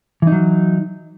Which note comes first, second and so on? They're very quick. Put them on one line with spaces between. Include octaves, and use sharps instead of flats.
E3 D#4 F#3